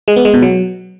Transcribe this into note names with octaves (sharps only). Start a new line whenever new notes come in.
G#3
B3
G#3
B2
F#3